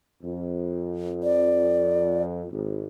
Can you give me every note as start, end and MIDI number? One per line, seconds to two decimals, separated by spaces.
0.23 2.45 41
1.23 2.23 74
2.51 2.87 32